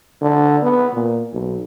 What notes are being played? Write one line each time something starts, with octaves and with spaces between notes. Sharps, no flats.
D3
B3
A#2
B1